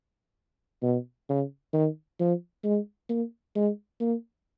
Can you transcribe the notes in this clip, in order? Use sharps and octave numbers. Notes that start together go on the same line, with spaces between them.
B2
C#3
D#3
F3
G#3
A#3
G#3
A#3